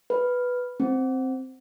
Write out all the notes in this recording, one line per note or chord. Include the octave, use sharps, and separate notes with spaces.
B4
C4